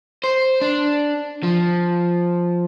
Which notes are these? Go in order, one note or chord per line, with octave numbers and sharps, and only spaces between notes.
C5
D4
F3